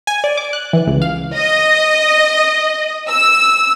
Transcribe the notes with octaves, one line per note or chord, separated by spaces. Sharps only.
G#5
D5
D6
F#6
E3
C#2
F5
D#5
E6